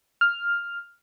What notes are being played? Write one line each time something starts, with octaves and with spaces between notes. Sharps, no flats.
F6